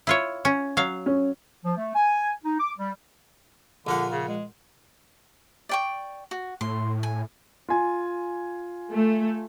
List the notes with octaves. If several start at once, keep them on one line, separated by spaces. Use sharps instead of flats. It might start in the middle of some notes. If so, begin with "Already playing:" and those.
E4 F4 C#5
C#4
F#3 F5
C#4
F3
A3
G#5
D#4
D6
G3
A#1 D3 F4 F#5
C#3
G#3
D5 G5 C#6
F#4
A2 C6
G#5
F4 G#5
A3